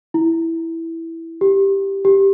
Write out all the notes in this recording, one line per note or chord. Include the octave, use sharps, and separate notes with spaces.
E4
G4
G4